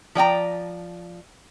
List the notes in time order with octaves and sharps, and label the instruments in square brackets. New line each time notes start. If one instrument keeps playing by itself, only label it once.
[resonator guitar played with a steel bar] F3 D5 G5 A#5